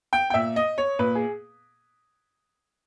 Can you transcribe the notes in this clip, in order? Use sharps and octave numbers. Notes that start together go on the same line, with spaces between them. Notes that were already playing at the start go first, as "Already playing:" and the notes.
G5
G5
A#2 E5
D#5
C#5
A#2 B4
G#4